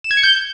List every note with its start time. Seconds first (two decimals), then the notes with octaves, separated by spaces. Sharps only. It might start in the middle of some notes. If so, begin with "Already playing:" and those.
0.04 E7
0.11 G#6
0.17 C#7
0.23 G6